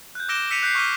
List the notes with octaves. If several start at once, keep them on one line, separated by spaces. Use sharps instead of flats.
F#6 G6
D6 E6 A#6 D7 E7 G7
E6 B6 C#7 D#7 F7
F#6 G6 B6 C7
C#6 D6 F6 D#7 G7